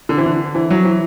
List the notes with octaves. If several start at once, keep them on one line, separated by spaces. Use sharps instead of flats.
D3
E3
D3
E3
F#3
E3